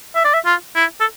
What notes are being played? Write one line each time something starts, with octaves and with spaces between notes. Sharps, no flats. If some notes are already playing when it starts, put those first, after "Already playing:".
E5
D5
E5
F4
E4
A4